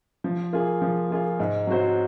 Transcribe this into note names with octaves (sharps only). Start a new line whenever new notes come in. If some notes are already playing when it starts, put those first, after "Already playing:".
F3
A#3 F4 G#4
F3
A#3 F4 G#4
G#2
F#3 C4 F#4 C5